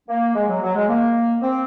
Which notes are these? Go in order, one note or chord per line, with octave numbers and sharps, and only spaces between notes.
A#3
G#3
F#3
F#3
G#3
A#3
C4